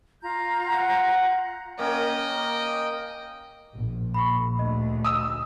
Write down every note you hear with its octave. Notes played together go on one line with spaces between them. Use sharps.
F4 A#5 G6
F#5
A#3 C#4 D#5 G5
A#1
B5 C#6
D2 D#5
D#6 E6